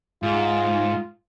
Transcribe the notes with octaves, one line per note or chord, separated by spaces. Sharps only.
G#2 F4